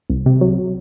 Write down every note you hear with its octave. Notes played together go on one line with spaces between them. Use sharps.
C2
C3
F#3